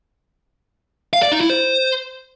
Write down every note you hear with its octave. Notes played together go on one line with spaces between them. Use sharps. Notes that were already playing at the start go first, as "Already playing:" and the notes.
F5
D5
D#4
E4
C5